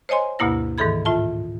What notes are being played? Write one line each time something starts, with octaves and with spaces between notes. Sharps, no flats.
C5 C#5 D#5 G#5 C6
D2 G2 B2 A#3 E4 A#6
G#2 D#3 E3 A4 B5 G#6
A2 F4 E5 A5